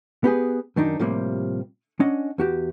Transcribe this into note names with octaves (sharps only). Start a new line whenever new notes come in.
B3 G4 G#4 B4
F#2 D#3 D4 D#4
A2 C3 F3 G3 A#3
C#4 D4 D#5 F#5
E2 F#4 G4